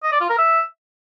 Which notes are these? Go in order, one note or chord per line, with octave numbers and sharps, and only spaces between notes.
D#5
D5
F4
A#4
E5